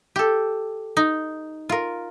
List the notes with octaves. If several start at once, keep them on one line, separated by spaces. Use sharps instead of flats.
G4 A4
D#4
F4 A#4